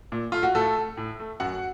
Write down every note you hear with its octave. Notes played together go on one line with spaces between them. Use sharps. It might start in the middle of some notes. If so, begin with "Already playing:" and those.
A#2
A3 F4
F#4
A2 A3 A4
A3
A2
A3
F#2 F#4 F#5